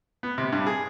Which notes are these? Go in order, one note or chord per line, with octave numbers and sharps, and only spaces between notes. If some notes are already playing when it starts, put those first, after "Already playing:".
B3
C3
G2
G#4